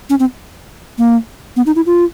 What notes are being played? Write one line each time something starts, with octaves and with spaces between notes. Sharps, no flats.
C#4
C4
A#3
B3
D#4
E4
F4